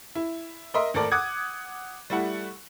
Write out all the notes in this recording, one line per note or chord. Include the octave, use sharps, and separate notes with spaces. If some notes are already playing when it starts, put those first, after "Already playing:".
E4
A#4 D#5 E5 C6
G#1 A3 A4 A#4 D5 D6
F#5 D6 D#6 F#6 G#6
G3 A3 E4 F#5